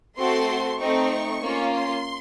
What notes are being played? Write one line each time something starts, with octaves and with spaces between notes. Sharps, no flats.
A3 C4 F#4 A4 C6
A3 C4 D#4 C#6
A#3 C#4 F4
C6